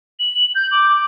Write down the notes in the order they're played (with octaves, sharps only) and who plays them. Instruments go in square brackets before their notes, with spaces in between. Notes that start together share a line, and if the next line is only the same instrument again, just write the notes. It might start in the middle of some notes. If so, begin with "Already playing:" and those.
[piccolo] F#7
G6
D6